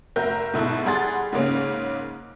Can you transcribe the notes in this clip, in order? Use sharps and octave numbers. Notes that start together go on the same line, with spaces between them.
F1 F#4 A#4 E5 G6
G#2 B2 E4 A4
G3 G#4 F#5 C6 A6
G#2 C#3 A#3 C#4